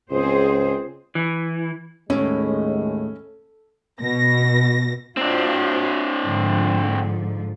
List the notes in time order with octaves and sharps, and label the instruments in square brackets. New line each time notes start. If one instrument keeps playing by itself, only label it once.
[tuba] C#2 [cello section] C4 G#4 C5
[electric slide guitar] E3
[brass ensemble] D#2 G#3 [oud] A2 [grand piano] C#4
[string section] B2 A#6
[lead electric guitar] C4 D4 [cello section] F4 F#4 C5
[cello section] G#2 D3 F3